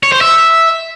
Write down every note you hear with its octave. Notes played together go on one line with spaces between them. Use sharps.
C#5
C5
E5